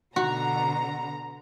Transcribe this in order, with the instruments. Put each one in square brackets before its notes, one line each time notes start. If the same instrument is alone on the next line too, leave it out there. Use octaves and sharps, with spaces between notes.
[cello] B2 D3 [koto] F#4 [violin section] A#5